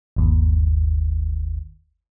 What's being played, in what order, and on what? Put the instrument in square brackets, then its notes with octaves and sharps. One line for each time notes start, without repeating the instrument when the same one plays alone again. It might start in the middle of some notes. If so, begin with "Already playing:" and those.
[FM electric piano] G1 D#2